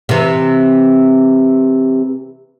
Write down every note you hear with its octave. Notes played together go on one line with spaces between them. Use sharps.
C3 E3